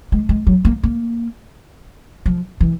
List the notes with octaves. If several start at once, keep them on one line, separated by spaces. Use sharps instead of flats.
G#3
G#3
F#3
A#3
A#3
F3
E3